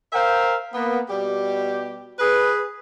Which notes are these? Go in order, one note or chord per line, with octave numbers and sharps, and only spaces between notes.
A#4 C5 E5 F5 G5
A#3 B3
B2 G3 G4
G#4 B4